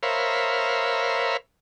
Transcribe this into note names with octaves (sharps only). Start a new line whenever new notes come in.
A#4 C5 C#5 E5 F5 B5